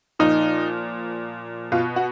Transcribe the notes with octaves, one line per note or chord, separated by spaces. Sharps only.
A#2 F3 D#4
B2 F4
F#4